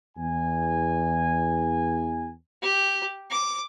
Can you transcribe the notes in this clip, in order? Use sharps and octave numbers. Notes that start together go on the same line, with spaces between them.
E2 G#5
G4
D6